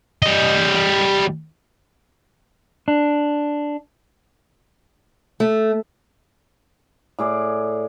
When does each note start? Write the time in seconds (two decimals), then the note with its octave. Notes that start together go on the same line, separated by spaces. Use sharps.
0.22 G3 D#5
2.88 D4
5.40 A3
7.19 A2 G#4 D5